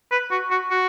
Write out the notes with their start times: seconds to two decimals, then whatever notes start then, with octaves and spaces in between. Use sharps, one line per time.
0.12 B4
0.31 F#4
0.51 F#4
0.71 F#4